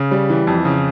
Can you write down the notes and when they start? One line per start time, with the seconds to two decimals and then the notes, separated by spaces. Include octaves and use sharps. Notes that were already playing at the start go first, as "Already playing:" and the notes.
Already playing: C#3
0.11 G3
0.29 E3
0.47 F2
0.65 C#3